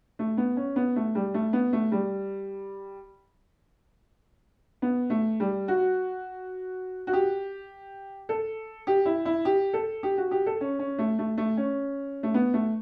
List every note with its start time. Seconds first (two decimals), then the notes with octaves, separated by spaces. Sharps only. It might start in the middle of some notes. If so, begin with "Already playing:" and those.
0.19 A3
0.38 B3
0.57 C#4
0.76 B3
0.96 A3
1.15 G3
1.34 A3
1.53 B3
1.73 A3
1.92 G3
4.82 B3
5.10 A3
5.40 G3
5.68 F#4
7.07 F#4
7.13 G4
8.29 A4
8.87 G4
9.06 E4
9.25 E4
9.45 G4
9.73 A4
10.03 G4
10.18 F#4
10.31 G4
10.46 A4
10.61 C#4
10.79 C#4
10.99 A3
11.19 A3
11.38 A3
11.57 C#4
12.23 A3
12.34 B3
12.54 A3